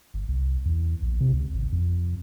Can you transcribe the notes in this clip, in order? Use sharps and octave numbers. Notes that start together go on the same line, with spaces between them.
G1
C2
E2
A#1
C3
C#2
G#1
F2